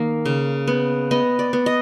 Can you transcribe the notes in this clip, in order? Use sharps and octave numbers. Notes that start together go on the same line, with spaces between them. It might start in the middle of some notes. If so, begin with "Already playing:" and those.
Already playing: D#3 A#3
C#3
B3
B3 D#5
D5
B3
D#5